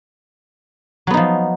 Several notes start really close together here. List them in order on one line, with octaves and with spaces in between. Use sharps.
F#3 B3 D#4 F3